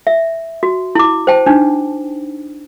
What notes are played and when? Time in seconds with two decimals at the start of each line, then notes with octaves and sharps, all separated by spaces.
0.07 E5
0.63 F#4
0.95 E4 D6
1.27 C5 G5 A5
1.46 D4 D#4